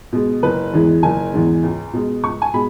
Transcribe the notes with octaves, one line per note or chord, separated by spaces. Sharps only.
B2 G#3
F#1 B4
E2 E3 G#3
F#1 G#5
E2 E3 G#3
C#2
B2 G#3
C#2 C#6
G#5
B2 G#3 B5